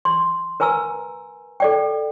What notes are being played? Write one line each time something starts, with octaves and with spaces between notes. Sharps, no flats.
C6
A#4 B4 G#5 A#5 E6
A4 D5 G5